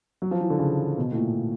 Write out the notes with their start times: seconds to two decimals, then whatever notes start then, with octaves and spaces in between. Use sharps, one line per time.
0.22 F#3
0.31 F3
0.40 E3
0.50 D3
0.59 C#3
0.98 B2
1.12 A2
1.16 A#2